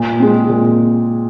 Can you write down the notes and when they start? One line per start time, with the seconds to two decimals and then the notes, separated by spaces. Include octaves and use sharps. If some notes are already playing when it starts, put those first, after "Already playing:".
Already playing: A#2
0.20 G#3 C4
0.49 A#2